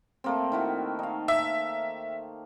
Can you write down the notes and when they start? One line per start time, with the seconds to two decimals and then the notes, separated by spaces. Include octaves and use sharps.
0.24 A3 A#3 C4
0.52 D#3 E4 F#4
0.99 D#4 F5
1.28 E5